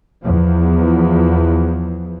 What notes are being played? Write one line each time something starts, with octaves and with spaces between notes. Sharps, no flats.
E2 F3